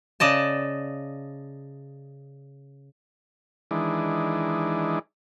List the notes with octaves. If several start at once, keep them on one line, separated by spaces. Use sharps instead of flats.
C#3 D5 D#5 A5
D#3 E3 G#3 D4